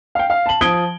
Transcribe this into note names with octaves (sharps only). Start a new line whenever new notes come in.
F5 G5
F5
A5 F#7
F3 D#6 G#6 D7 G7